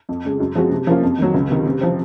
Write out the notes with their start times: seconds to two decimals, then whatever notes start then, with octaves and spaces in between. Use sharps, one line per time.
0.09 F2
0.25 C#3 G#3
0.40 F#2
0.55 F3 G#3 C4 F#4
0.71 C3
0.87 F3 A#3 C#4 F4
1.03 F2
1.18 D#3 F#3
1.34 C#2
1.50 C3 D#3
1.66 C3
1.81 F3 C4